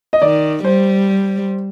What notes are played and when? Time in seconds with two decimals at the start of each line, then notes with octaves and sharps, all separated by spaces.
0.13 D#5
0.22 D#3 D5
0.65 G3 C5